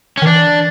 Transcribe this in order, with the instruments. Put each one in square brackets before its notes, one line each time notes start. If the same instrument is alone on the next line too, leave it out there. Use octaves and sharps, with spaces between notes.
[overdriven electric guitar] C#4
[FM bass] D#3
[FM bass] E3 [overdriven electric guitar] D4